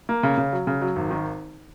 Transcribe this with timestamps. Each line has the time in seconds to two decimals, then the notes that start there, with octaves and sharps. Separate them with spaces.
0.09 A#3
0.23 C#3
0.38 C#3
0.53 F#3
0.67 C#3
0.81 F#3
0.96 G#1
1.11 D#3